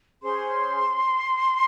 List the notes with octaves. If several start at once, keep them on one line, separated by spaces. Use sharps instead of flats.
C#4 G#4 C5 C6